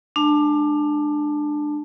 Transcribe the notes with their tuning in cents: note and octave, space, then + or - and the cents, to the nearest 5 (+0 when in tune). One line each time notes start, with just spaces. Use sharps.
G#3 +25 D4 +20 A5 +0